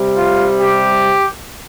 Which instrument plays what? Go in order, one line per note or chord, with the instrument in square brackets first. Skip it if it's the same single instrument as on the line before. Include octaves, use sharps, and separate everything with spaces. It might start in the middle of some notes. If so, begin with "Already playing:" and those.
Already playing: [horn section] C3 G3
F4
G4